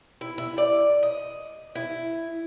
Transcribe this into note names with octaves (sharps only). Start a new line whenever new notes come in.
E4
E4
D5
D#5
E4